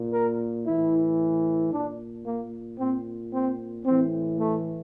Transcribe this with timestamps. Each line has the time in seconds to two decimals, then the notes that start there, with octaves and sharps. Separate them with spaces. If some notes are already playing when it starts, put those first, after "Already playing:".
Already playing: A#2
0.13 A#4
0.66 A2 E3 E4
1.73 A#2 D4
2.26 A#3
2.79 A#2 C4
3.33 C4
3.86 A2 E3 C4
4.39 A3